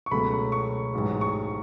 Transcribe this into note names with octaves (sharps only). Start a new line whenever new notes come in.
C#6
C#2 B2 F#3 A3 C#4 B5
C#6
A1 G#2 F#3
C#6